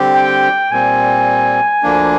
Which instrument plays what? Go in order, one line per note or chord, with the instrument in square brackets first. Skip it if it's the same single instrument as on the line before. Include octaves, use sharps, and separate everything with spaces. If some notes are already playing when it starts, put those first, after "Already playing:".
Already playing: [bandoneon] D3 G3 C4 G4
[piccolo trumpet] G5
[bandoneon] A#2 G3 C4 [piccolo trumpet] G#5
[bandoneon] D2 D3 F3 A#3 D4